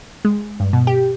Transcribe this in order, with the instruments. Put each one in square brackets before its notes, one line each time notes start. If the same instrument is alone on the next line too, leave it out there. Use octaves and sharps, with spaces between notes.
[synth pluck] G#3
G2
B2
G4